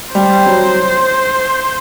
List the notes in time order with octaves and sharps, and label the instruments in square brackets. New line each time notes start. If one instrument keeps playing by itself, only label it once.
[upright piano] G3 [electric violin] C5
[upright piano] F#3